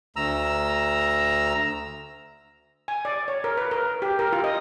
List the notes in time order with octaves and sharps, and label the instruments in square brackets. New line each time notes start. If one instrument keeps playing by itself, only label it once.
[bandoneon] D2 A#5 E6
[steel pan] G#5
D5
C#5
A#4
B4
A#4
G4
A#4
F4
D#5